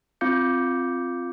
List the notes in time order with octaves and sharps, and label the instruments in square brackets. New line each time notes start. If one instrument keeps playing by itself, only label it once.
[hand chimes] C4 F4 F5 D6 G6 C#7